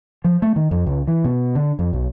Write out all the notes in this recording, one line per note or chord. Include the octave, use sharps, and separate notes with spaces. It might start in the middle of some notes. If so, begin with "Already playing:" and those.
F3
A3
D#3
F2
C#2
E3
B2
D3
F2
B1